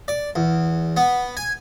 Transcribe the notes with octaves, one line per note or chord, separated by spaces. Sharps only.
D5
E2
B3
G#5